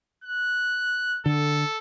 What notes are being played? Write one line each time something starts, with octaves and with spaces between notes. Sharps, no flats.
F#6
D3 A4